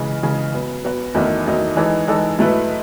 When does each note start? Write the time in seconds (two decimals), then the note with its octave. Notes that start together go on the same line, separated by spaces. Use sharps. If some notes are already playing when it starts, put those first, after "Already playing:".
Already playing: C#3 E3 G#3
0.23 C#3 E3 G#3
0.53 F#3 B3 F#4
0.84 F#3 B3 F#4
1.14 E2 D#3 F#3 A3 D#4
1.46 E2 D#3 F#3 A3 D#4
1.76 E3 G#3 D#4 A4
2.08 E3 G#3 D#4 A4
2.38 G#2 F#3 A3 E4 B4